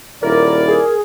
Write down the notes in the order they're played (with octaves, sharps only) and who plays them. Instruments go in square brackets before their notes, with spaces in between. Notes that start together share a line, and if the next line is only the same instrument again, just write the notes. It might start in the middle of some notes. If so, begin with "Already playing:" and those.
[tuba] D#1 [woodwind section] E4 D5 [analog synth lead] A#4
[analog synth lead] G#4 [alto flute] A#4